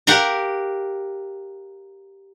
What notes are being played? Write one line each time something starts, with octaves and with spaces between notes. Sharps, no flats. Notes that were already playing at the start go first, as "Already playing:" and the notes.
G4 A#4 F5 F#5 A#5